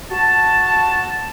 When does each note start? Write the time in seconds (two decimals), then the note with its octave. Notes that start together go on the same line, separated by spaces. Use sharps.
0.11 F#4 A5